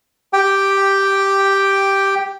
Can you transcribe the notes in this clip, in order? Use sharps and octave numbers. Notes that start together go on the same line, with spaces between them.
G4 G5